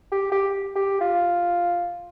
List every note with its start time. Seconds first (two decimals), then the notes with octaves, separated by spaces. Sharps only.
0.12 G4
0.32 G4
0.76 G4
1.01 F4